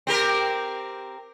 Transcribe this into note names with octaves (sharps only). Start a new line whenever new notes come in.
C4 G4 A#4